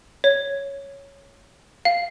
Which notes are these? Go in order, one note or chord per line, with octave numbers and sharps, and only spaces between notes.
C#5
F5